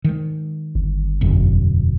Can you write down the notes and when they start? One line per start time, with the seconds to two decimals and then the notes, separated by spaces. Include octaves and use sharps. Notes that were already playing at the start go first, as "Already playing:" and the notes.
0.04 D#3 G#3
0.75 G1
1.21 E1 F#2 D3